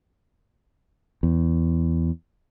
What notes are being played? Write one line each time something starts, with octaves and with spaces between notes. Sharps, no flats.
E2